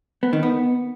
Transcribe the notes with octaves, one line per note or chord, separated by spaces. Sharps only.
B3
D#3
B3